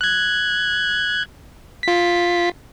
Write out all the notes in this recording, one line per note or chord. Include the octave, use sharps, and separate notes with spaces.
F#6 G#6
F4 B6